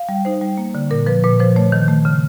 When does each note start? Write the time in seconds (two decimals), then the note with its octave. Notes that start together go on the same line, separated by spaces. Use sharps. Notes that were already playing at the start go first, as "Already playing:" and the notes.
Already playing: F5
0.09 G3
0.25 D#4 C5
0.41 G3
0.58 A#3
0.75 D3
0.90 A#2 A#4
1.06 F3 B4
1.24 A#2 B4
1.40 F3 C5
1.56 A3 C#5
1.72 D#3
1.88 A3
2.05 C#3